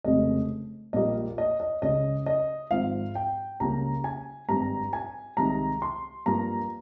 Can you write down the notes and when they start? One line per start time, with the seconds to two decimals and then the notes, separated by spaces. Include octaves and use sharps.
0.04 F1 F2 C#3 G#3 D#5
0.93 A#1 A#2 G3 A#3 D#5
1.38 D#5
1.60 D#5
1.82 C#2 C#3 G#3 D#5
2.26 D#5
2.71 G#1 G#2 F3 F5
3.15 G5
3.60 C#2 C#3 G3 A#3 A#5
4.04 G#5
4.48 G#1 G2 G3 A#5
4.93 G#5
5.37 C2 C3 D#3 G#3 A#5
5.82 C6
6.26 G2 F3 A#3 A#5